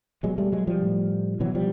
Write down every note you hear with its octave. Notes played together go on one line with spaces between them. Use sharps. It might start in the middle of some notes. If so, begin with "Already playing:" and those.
B2 F#3 G#3
G3 A3
F#3 G#3
F3 G3
A2
B2 E3 F#3
F3 G3